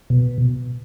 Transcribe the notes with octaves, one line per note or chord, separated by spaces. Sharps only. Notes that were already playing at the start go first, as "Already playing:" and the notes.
B2